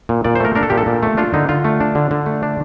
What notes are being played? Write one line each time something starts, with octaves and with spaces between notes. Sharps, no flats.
A#2
A#2 D5
C5
A3 A#4
D4 A#4
A4
A#2 G4
A4
A#2
A3
D4 F4
D3 D#4
D3 F4
A3
D4
D3
D3
A3
D4